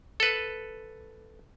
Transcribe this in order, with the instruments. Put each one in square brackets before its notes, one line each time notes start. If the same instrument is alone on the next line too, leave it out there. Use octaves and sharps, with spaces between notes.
[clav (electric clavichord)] A4 B4